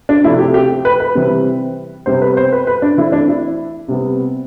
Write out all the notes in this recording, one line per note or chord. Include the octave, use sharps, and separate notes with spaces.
D4
C3 F3 A3 E4
G4
G4
B4
B4
C3 E3 G3 C4
C3 G3 B3 C5
B4
C5
B4
B4
D4
E3 A3 C4 E4
D4
E4
C3 G3 B3